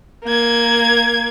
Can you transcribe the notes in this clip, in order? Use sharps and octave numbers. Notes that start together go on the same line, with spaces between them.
A#3 G#6